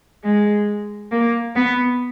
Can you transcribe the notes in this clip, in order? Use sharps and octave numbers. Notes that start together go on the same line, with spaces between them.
G#3
A#3
B3